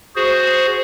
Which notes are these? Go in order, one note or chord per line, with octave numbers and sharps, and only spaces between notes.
F#4 G#4 C5